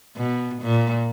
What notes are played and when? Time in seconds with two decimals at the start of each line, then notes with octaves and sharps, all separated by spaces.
0.17 B2
0.62 A#2